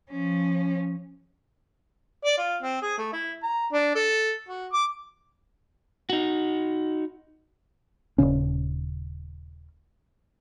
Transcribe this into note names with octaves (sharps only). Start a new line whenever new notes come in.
F3 C#4
D5
F4
C4
G#4
A3
E4
A#5
D4
A4
F#4
D6
D#4 F#4
D#1 B1 C#3 C#4